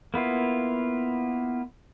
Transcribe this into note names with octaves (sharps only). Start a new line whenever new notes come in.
A#3 B3 E4 F4